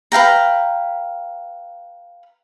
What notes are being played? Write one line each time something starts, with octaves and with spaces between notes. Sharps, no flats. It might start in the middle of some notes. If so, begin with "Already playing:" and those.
B4 F5 G5 A#5